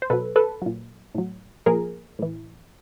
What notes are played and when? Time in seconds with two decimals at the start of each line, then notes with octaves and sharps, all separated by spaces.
0.02 C5
0.10 B2 F#3 A4 B4
0.36 A4 B4
0.62 A#2 F#3
1.14 A2 F#3
1.66 A#2 F3 G#4 A#4
2.19 A2 E3